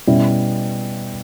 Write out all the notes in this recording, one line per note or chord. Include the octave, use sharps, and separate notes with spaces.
B2 G3 C#4 E4